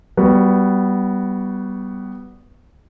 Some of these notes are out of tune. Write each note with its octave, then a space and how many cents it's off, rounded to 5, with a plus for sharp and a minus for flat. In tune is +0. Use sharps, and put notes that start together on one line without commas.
G3 -15 B3 +0 F#4 +0